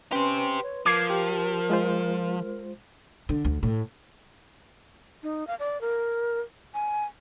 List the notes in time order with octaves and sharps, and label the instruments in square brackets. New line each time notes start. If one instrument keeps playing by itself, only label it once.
[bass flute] C#4 [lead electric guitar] G4 C5 [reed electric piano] B4 C6
[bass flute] C#5
[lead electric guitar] F3 [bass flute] A#4 [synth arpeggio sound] D6 G#6 C7
[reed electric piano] G4
G#3 F4 C5
[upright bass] D3
D2
A2
[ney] D#4
F5
D5
A#4
G#5